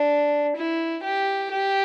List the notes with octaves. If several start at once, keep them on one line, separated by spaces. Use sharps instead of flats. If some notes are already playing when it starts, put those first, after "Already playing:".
Already playing: D4
E4
G4
G4